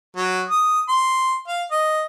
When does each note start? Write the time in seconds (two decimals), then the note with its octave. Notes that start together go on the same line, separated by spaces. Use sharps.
0.17 F#3
0.49 D#6
0.89 C6
1.48 F5
1.72 D#5